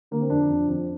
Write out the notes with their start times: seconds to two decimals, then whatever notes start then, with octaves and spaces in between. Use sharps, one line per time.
0.11 D3 A#3
0.21 C4
0.30 F2 D4
0.49 F2
0.68 F2